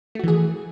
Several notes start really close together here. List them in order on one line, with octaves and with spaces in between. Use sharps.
A3 F#4 E3 G#4